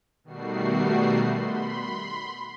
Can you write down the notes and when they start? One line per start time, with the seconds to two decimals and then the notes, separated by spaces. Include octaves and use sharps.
0.24 B2 D#3 G3 A3 F#4 C7
1.28 B5 C6